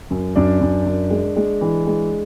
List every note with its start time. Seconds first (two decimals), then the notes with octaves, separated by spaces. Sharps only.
0.10 F#2
0.35 F#2 D4 D5
0.61 F#2
0.86 F#2
1.10 G#3
1.36 G#3
1.61 E3
1.87 G#3